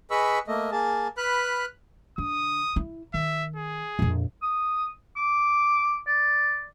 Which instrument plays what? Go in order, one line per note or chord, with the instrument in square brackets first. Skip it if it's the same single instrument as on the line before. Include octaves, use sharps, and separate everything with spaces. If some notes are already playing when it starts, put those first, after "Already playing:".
[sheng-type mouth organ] G#4 B4 D#5 B5 C#6 E6
A3 A#3 D#5
A#3 G#4 A5
B4 B5 F6 F#6
[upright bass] D3 [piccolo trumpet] D#6
[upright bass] E4
[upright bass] D#3 [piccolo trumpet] E5
[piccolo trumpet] G#4
[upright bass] A#1 F2
[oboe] D#6
D6
D5